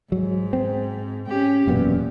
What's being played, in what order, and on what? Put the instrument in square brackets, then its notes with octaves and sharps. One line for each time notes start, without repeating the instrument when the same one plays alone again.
[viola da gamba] G#2 [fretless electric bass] F#3
[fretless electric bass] C4
[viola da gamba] C#4 G4
[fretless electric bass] E1 F#2 B3 [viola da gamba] A#2